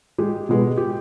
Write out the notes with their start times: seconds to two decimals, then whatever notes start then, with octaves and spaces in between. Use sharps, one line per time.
0.18 G#3 G4
0.49 B2 G#3 B4
0.77 G4